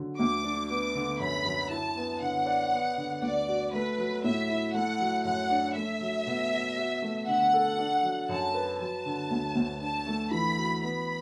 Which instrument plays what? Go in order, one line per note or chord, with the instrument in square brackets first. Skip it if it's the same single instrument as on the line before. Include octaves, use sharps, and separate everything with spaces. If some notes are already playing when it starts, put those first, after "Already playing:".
Already playing: [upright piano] D3 F#3
[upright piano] D2 [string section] D6
[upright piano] D4
[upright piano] B3 [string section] D6
[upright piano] D3
[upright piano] F#2 [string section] B5
[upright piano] F#2
[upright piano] E4 [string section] A5
[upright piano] B3
[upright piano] D3 [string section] F#5
[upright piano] D5
B3
D3
[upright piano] D2 [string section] D5
[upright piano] F#4
[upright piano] A3 [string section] B4
[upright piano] F#3
[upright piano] A2 [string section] E5
[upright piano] E4
[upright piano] A3 [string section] F#5
[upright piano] F#3
[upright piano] F#2 [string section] F#5
[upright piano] D4
[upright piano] A3 [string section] E5
[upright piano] F#3
B2
F#4
F#4
A3
[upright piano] D3 [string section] F#5
[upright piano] A4
D4
F#3
[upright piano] F#2 [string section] A5
[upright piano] B4
[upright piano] F#3 [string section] A5
[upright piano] D3
D2
D2
[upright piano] D4 [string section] A5
[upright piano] A3
[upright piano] E3 [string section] B5
[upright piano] F#4
[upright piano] B3 [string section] B5